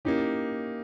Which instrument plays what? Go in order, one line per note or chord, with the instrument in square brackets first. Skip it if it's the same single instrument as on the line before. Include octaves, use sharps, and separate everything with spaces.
[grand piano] A#3 D#4 G4 [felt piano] C#4 E4